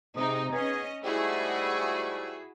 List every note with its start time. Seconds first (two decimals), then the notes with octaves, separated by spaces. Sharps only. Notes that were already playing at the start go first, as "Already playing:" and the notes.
0.16 G#2 C3 D#4 D#6
0.52 B3 C#4 G#4 D#5
1.04 G#2 G3 A3 E4 F#4 G#4